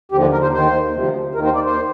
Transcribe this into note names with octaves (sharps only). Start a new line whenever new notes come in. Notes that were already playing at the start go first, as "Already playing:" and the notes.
D#2 D3 F3 G4
A#4
C5
D#2 D#3 C5
D2 C3 F3
D#2 D#3 A#4
C5
D5
C5